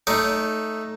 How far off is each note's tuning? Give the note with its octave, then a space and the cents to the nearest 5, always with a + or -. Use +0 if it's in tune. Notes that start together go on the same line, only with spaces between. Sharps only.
A3 +0 D#4 +0 C#5 +40